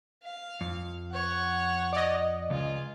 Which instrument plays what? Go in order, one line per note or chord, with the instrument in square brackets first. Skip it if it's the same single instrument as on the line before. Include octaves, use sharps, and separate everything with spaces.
[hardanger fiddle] F5
[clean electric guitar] F2
[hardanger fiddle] C#5 F#5
[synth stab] D5 D#5
[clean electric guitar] C#2 [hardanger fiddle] F4 G#4